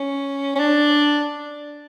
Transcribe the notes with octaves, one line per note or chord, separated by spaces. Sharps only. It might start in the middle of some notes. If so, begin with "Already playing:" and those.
Already playing: C#4
C#4
D4